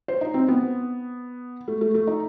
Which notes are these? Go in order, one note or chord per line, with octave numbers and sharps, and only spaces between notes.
C5
D#4
C4
B3
A3
A3
A3
D#4